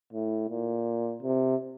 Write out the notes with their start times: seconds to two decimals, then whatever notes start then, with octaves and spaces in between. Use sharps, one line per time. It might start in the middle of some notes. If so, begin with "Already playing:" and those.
0.13 A2
0.50 A#2
1.23 C3